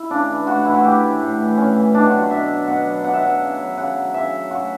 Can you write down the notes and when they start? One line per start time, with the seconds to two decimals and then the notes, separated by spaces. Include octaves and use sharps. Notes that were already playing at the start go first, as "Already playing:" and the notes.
Already playing: E4
0.10 C#3 D4
0.29 E3
0.47 A2 F#4
0.65 E3 E4
0.74 F#4
0.84 A2 G4
1.03 E3
1.21 A2
1.39 E3
1.57 A2 C#4
1.76 E3
1.94 B2 D4
2.06 F#4
2.13 F#3
2.19 F#4
2.30 B2 E5
2.50 F#3
2.68 B2 F#5
2.86 F#3
3.04 B2 F#5
3.13 E5
3.22 F#3 F#5
3.41 C#3
3.59 F#3
3.77 C#3 F#5
3.96 F#3
4.14 C#3 E5
4.32 F#3
4.51 C#3 F#4